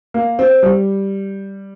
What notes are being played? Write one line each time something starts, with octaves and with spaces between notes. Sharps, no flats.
A#3
C4
G3